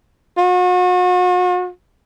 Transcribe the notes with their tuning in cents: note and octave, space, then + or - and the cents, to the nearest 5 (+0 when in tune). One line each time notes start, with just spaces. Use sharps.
F#4 -40